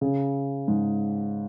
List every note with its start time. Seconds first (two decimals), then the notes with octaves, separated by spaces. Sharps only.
0.01 C#3
0.68 G#2